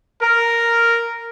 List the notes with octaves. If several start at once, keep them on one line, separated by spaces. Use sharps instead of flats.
A#4